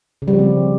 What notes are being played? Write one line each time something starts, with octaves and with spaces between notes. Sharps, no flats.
C#3
G3
F3
C4